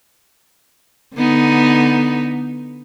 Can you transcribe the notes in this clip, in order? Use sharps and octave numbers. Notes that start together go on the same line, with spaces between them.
D3 B3 D#4